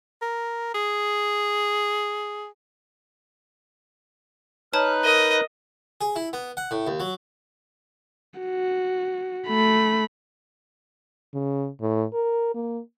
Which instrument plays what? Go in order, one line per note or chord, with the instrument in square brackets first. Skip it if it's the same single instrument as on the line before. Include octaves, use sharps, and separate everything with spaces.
[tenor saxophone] A#4
G#4
[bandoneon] D#4 B4 F#6 [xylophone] C#5 A5 [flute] F6
[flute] A#4 [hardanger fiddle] D#5
[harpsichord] G#4
E4
B3
F#5
A2
D#2
F#3
[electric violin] F#4
A3 B5
[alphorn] C#3
A2
A#4
A#3